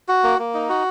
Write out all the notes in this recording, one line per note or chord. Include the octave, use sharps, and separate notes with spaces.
F#4
A#3
A#3
D#4
F#4